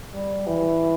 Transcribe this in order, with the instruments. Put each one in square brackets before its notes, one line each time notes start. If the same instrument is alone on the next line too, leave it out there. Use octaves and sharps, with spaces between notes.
[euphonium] G3
E3